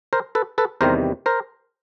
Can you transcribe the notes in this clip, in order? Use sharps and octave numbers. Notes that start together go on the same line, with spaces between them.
A#4 C5
A4 B4
A4 B4
E2 C3 D#3 G3 A#4 C5
A#4 C5